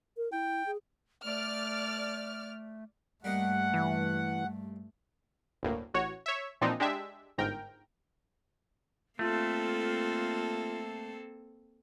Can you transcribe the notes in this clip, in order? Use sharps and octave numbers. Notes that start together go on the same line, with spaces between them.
A#4
E4 G5
G#4
A3 D5 F6
G2 G3 A3 A#3 D#5 F#5
E3
G1 D2 A2 A#3
A1 F#4 C#5
C#5 E5
A#2 E3 F3 C4 D4 D#4
G#3 D4 G4 E5
G1 G#2 A#4 G5
A3 A#3 C4 F4 A4